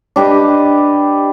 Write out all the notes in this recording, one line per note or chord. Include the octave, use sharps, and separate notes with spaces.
D4 G4 B4 D#5